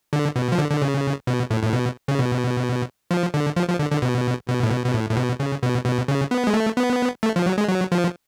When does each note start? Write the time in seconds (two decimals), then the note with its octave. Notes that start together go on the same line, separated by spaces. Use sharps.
0.13 D3
0.36 B2
0.52 F3
0.58 D3
0.71 D3
0.82 C#3
1.27 B2
1.51 A2
1.63 A2
1.73 B2
2.08 C#3
2.19 B2
3.11 F3
3.34 D3
3.57 F3
3.68 F3
3.79 D3
3.91 D3
4.02 B2
4.48 B2
4.63 A2
4.70 B2
4.85 B2
4.94 A2
5.09 A2
5.17 B2
5.40 C#3
5.63 B2
5.86 B2
6.08 C#3
6.31 B3
6.47 G#3
6.54 A3
6.77 B3
7.23 A3
7.36 F3
7.46 F#3
7.58 G#3
7.68 F#3
7.92 F3